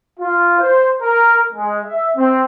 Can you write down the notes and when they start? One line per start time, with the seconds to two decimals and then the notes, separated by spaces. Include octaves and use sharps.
0.19 F4
0.58 C5
1.01 A#4
1.53 G#3
1.85 E5
2.15 C4